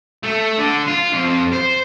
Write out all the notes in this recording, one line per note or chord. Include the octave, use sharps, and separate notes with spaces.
A3
D3
F4
F2
C5